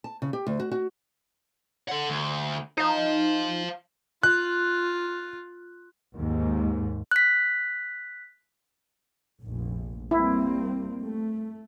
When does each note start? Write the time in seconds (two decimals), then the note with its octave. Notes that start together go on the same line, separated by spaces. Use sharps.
0.04 A5
0.22 C#3
0.33 G4
0.47 D2
0.60 F#4
0.72 F#4
1.89 A4 F#5
2.08 D2
2.78 D#4 C5 F5
4.23 F4 F#6
6.15 D#2 G#2
7.11 F#6 B6
9.40 F1 A#1
10.11 G3 A#3 C4 E4
11.02 A3